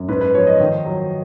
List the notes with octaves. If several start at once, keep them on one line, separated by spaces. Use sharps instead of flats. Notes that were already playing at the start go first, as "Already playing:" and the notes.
Already playing: F#2
G#2 B4
B4
F3 C#5
D#5
D#3
F#3